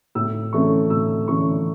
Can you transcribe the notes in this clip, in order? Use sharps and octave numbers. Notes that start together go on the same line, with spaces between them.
A2 E6
E3 A3 C#4 C#6
A2 E6
E3 A3 C#4 C#6